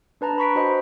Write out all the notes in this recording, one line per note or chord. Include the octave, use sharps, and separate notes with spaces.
D4 B4 A5 A#5
B5 C#6 B6 D7
F#4 C5 D#5 B5